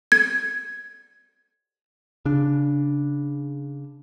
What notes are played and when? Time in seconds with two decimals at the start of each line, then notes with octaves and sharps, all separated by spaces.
0.12 G#6
2.25 C#3 D4